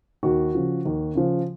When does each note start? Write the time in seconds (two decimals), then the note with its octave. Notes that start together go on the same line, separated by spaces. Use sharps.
0.23 D#2 F#4
0.55 C#3 F3
0.85 D#2
1.15 C#3 F3